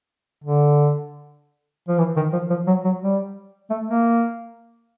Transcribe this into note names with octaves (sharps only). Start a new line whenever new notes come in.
D3
F3
E3
D#3
F3
F3
F#3
F#3
G3
A3
A#3